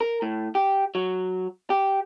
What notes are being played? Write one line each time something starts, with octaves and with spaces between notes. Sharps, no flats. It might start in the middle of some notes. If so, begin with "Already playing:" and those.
A#4
A2
G4
F#3
G4